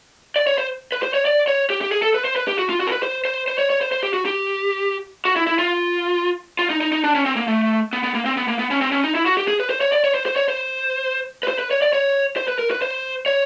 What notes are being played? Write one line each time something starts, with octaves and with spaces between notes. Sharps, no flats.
D5
C#5
C5
B4
C5
C#5
D5
C#5
G4
G4
G#4
A4
B4
C5
B4
G4
F#4
F4
F#4
A#4
B4
C5
C5
C5
C#5
C#5
C5
C5
G4
F#4
G4
F#4
E4
E4
F4
F4
D#4
D#4
D#4
D4
C#4
C4
A#3
A3
B3
B3
A#3
C4
B3
A#3
B3
C#4
C4
C#4
D#4
E4
F#4
G4
G#4
B4
C5
C#5
D5
C#5
C5
C5
C#5
C5
B4
C5
B4
C#5
D5
C#5
C5
B4
A#4
B4
C5
C#5